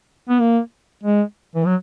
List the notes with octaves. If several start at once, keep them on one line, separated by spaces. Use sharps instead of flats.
B3
A#3
G#3
E3
F#3